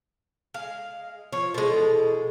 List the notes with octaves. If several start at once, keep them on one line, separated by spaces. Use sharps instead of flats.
G#3 F5
F3 C#5
E2 B2 G#3 A4 C5